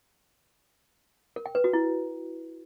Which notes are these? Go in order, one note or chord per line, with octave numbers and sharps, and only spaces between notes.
A#4
G5
B4
F#4
E4